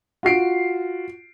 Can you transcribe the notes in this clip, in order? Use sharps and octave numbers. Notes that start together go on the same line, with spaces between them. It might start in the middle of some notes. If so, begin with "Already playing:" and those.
F4 F#4 C7 D7